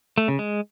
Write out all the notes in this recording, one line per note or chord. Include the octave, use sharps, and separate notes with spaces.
A3
C#3
G#3